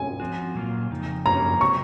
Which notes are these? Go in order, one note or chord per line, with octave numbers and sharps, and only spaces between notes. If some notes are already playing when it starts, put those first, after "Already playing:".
Already playing: G#5
F3 C4 F#4
A#2 F#3 A#3 F4
F2 C#3 D#4
F#2 C#3 F3 A#3 C#4 A#5
C#3 F#3 C4 C#6